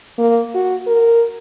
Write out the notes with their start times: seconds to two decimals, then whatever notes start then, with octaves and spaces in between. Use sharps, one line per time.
0.18 A#3
0.55 F#4
0.87 A#4